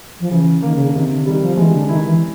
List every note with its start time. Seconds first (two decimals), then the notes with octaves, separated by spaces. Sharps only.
0.20 F3
0.31 C#3 E3
0.62 D#3 A#3
0.76 C#3
0.85 D3
0.94 C3 D#3
1.10 D3
1.26 D#3 G3
1.42 F3
1.57 E3 G#3
1.73 D3
1.89 D#3 E4
2.06 E3